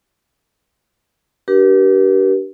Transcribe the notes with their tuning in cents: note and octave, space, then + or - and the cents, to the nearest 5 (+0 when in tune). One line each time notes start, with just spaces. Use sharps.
D4 +0 G4 -30 A#4 +45